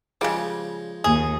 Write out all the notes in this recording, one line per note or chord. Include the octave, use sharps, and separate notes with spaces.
C#3 F3 G3 G#3
D#2 G#4